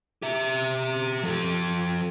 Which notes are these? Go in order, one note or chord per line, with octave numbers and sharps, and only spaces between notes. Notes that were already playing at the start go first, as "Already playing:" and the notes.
G4 E5
F3 A4